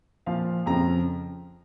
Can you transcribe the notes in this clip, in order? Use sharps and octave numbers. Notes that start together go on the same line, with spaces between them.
A#2 F3 F5
F2 C#3 F3 A#5